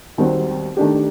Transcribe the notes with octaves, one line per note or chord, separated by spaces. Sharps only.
D#2 D#3 G3 C4 F#4
D#3 A3 D4 G4